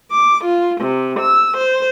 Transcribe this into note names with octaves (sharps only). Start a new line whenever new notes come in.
D6
F4
C3
E6
C5